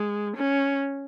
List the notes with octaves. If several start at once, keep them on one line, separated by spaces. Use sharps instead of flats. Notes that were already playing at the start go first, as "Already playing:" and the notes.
Already playing: G#3
C#4